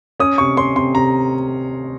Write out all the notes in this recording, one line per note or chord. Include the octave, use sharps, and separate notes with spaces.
C#4 D#6
C3 C#6
C#4 C6
C3 C6
C3 A#5